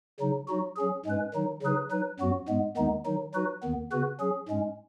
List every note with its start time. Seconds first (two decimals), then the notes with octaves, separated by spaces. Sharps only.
0.20 C#3 F#3 D#4
0.48 F#3 D#4 F#4
0.76 F#3 C#4 G#4
1.06 G#2 G#3 C#4 B4
1.34 D#3 F#3 D#4
1.62 C#3 F#3 D#4 G#4 B4
1.91 F#3 D#4 B4
2.20 F#2 F#3 B3 F#4
2.48 G#2 G#3 B3
2.77 D#2 D#3 G#3 B3 D#4
3.05 D#3 F#3 D#4
3.34 F#3 D#4 F#4 B4
3.63 D#2 D#3 B3
3.92 C#3 B3 F#4 B4
4.20 F#3 C#4 G#4
4.49 G#2 G#3 C#4